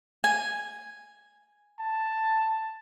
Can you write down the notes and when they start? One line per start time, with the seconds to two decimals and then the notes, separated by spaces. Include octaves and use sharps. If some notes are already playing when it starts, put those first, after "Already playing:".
0.24 G#5
1.79 A5